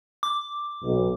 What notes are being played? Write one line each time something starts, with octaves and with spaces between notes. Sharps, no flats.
D6
B1